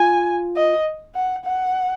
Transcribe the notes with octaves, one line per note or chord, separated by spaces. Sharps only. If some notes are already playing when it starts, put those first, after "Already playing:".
Already playing: F4 G#5
D#5
F#5
F#5